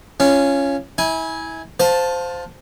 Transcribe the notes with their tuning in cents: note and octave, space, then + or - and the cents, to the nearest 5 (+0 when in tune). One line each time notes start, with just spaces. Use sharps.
C#4 +0 F4 -25
E4 -30 G#5 +0
F4 +25 C5 -10 A5 +0